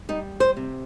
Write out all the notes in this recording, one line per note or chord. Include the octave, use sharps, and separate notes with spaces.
G3 D#4
C5
C3